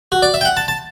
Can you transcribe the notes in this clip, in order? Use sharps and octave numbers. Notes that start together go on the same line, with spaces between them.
F#4
D5
E5
G5
F#5
A5
A5